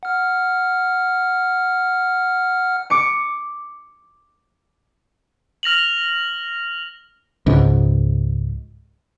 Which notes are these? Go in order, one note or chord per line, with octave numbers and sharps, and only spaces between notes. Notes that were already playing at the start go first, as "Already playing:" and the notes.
F#5 F6
D6 C#7
F6 A#6 F7 F#7
C#2 G#2